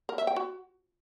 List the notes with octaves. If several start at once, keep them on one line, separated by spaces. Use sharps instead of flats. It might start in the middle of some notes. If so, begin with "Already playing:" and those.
A#4
E5
G5
F#4